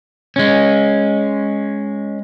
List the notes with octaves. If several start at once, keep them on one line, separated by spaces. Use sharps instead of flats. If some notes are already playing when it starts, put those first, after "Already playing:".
G#3 C#4